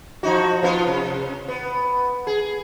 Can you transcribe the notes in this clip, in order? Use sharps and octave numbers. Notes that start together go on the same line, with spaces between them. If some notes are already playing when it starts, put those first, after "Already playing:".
F3 D#4 F#4
F3 B3 F4
C3
B3
G#4